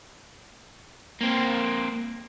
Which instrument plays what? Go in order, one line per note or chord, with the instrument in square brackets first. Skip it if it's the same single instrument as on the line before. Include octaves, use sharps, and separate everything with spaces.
[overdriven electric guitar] A#3 C4